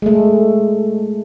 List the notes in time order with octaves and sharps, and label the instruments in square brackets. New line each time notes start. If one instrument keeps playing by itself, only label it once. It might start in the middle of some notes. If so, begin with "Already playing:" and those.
[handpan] G#3 A3